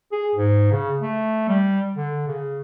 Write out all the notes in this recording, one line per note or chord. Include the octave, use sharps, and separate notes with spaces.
G#4
G#2
C#3
A3
G3
D3
C#3